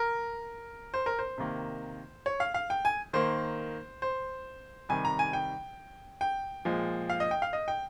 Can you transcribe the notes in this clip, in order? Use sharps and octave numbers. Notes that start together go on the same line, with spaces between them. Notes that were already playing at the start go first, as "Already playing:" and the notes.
Already playing: A#4
C5
A#4
C5
C3 D#3 A#3
C#5
F5
F5
G5
G#5
D#3 A#3 C5
C5
C3 D#3 G3 G#5
A#5
G#5
G5
G5
A#2 F3 G#3
F5
D#5
G5
F5
D#5
G5